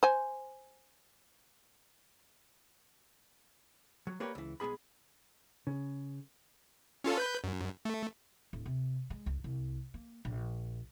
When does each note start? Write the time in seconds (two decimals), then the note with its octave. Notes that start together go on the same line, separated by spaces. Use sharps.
0.03 C5 G#5
4.07 F#3
4.20 A#3 G4 A#4 B4 C#5 D5
4.35 C#2 E3
4.60 B1 G#3 B3 G#4 B5
5.67 C#3
7.04 C#4 F4 A4
7.17 B4 G6
7.44 F#2
7.85 A3
8.53 D1
8.66 C3
9.10 G#3
9.26 C#2
9.44 C2
9.94 A#3
10.25 A#1